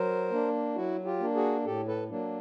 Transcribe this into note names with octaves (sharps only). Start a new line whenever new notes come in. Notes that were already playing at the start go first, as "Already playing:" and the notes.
Already playing: F#3 A#4 C5
A#3 D4
F#3 E4 F#4
F4 G4
A#3 D4
F#4 G#4
A2 G4 A4
A4 B4
F#3 A#3 D4